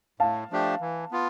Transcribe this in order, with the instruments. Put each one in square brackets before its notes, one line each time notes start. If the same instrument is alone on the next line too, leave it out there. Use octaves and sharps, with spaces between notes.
[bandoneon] A2 [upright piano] F5 A5
[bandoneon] F3 A3 D4 G4
E3
B3 F4